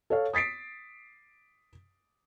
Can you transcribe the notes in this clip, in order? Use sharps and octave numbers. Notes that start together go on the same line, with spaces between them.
A4 C#5 F5
D#6 A6 B6 C7 D7